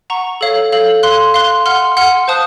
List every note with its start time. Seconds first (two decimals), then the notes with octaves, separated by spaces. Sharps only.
0.10 F#5 A#5 C#6
0.41 A4 C#5 F5
0.72 A4 C#5 F5
1.03 F5 C6 F#6
1.34 F5 C6 F#6
1.66 F#5 C6 F6
1.97 F#5 C6 F6
2.28 C5 F5 A5 D#6 F#6